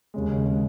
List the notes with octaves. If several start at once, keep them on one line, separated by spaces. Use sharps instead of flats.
D#2 C#3 G#3
C#3 G#3